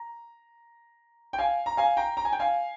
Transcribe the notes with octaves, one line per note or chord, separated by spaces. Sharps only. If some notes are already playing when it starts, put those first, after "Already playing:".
Already playing: A#5
G5
F5 G#5
A#5
F5 G#5
G5 A#5
A#5
G#5
G5
F5 G#5